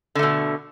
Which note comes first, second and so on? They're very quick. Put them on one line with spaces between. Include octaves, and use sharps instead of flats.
D3 A3 B2